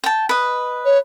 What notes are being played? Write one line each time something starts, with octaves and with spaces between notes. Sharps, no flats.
G5 A5
B4 D#5
C#5